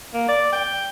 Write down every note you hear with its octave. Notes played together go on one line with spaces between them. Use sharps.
A#3
D5
G5